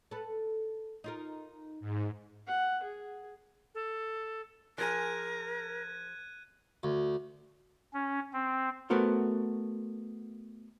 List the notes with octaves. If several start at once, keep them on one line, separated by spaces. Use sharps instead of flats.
A4 B4
D#4 F4 A#4
G#2
F#5
G#4
A4
F3 G#4 A#4 F#6 G#6 D#7
D2
C#4
C4
A3 B3 F#4 A#4 C5